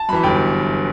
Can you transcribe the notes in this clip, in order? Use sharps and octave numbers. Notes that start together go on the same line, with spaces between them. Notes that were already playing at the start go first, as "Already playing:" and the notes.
Already playing: A5
F#2 E3 B5
G1 G5